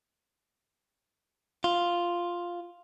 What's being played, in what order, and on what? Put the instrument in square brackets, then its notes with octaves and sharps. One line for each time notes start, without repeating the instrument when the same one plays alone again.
[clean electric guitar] F4